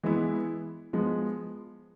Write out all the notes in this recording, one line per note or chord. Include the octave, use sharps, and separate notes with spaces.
E3 G#3 B3 E4
F3 G#3 B3